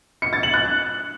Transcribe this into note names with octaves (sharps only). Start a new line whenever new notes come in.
C#7
A6
F#7
F#6